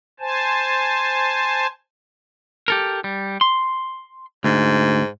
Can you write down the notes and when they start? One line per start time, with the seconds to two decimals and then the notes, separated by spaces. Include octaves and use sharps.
0.20 C5 G#5 A5
2.68 G4 A4 A#4
3.04 G3
3.41 C6
4.44 D2 G#2